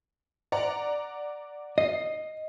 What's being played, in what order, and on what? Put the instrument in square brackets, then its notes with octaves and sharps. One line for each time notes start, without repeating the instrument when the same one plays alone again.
[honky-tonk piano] D5 F#5 A#5
[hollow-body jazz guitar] D#5 [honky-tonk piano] C7